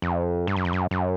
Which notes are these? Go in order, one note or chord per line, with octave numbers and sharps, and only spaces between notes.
F2
G2
F#2
F2
F#2
F#2